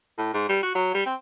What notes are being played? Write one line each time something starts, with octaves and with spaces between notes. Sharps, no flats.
A2
G#2
G3
F#4
F#3
G3
C4